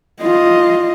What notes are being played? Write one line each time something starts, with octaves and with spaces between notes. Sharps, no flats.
F4 D#5